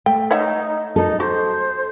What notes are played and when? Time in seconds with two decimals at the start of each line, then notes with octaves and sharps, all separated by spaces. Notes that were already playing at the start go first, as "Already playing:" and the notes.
0.06 A3 G5
0.31 D#4 C#5 E5 F#5
0.96 D#4 A4
1.20 F#4 C5